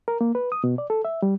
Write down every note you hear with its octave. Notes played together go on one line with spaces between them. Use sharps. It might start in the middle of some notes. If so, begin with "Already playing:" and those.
A#4
A#3
B4
D#6
B2
D5
A4
E5
G3